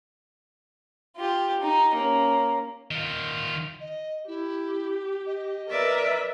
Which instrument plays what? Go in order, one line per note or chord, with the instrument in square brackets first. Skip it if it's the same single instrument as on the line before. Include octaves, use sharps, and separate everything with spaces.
[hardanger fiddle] F4 G4
D#4
A#3 C#4
[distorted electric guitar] D#3 F4
[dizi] D#5
[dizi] E4 [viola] G4
[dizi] D#5
[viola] A#4 B4 [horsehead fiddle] D5 E5